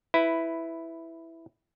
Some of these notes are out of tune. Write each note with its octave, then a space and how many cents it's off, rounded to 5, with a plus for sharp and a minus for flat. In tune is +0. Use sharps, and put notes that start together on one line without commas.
E4 +0 B4 +10